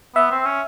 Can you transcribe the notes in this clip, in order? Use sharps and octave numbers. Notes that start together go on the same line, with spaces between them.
B3 E5
C4
C#4